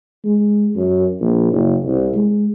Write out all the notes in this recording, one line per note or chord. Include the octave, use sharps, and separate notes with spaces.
G#3
F#2
A#1
F#1
C2
G#3